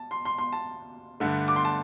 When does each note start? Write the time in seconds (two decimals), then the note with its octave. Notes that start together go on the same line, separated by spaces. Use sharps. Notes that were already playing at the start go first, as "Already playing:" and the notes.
Already playing: A5
0.11 C6
0.25 C6
0.38 C6
0.52 A5
1.20 G2 D3 A3
1.48 D6
1.56 C6
1.65 A5